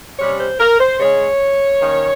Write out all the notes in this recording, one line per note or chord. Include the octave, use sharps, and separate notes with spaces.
C3 G3 C#4 C#5
C5
A#4
C5
C#3 G#3 C#4 C#5
D#3 A#3 C#4